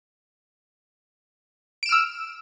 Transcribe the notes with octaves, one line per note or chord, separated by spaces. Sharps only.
E6 F6 D7 E7